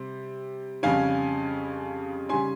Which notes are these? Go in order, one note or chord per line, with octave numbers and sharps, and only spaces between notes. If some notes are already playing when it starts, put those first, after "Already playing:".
Already playing: C3 G3 C4
F2 C#3 G3 C#4 F5 G#5
C#3 G3 C#4 G#5 C6